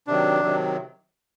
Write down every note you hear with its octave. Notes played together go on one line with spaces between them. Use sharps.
C3 D#3 F#3 D4
C3 D#3 F#3